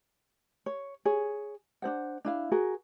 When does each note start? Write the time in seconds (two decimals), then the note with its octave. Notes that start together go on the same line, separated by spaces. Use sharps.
0.66 C#5
1.05 G#4 C#5
1.82 D4 D#4 C5 F#5
2.25 D4 E4 F5
2.52 F#4 G#4 A#4